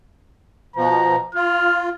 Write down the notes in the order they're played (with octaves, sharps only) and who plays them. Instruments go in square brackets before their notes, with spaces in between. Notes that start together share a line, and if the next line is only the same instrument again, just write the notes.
[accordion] B2 F3 [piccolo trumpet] A#5
[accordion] F4 [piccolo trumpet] F6